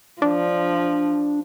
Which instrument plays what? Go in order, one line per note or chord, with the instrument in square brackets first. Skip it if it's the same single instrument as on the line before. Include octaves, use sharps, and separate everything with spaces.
[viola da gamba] F3 [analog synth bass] D4